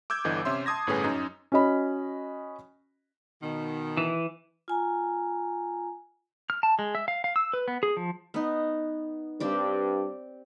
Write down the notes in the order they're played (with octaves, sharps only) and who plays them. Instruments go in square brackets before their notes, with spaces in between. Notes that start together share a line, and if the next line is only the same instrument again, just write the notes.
[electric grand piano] D6 E6 G6 G#6
G1 D3 E3 D#5
C3 C#4 E5 C6
A5 C6 D#6 G#6 A#6
G1 A2 C#4 G#4 B4 G#5
F#2 C#4 D#4
[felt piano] C#4 F#4 D#5 B5
[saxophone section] B2 D#3
[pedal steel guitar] E3
[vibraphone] F4 G#5 A#5
[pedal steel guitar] F6
A5
G#3
E5
F5
F5
E6
B4
B3
G#4
F3
[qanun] B3 D#4
[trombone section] G2 [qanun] C4 G4 D5